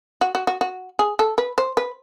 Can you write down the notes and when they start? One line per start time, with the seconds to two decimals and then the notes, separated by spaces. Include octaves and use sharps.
0.21 F#4
0.35 F#4
0.47 F#4
0.61 F#4
0.99 G#4
1.19 A4
1.38 B4
1.58 C5
1.77 B4